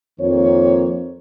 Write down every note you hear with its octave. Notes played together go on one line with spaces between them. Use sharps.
F2 D#3 A#3 C5 C#5